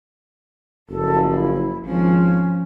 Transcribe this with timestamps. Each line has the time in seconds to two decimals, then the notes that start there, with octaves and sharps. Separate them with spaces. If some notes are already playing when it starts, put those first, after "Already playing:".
0.89 F#1 F3 F#3 A4
1.30 E4
1.85 G#1 F3 C#4